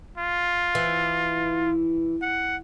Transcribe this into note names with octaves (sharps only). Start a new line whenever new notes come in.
F4
E3
F#5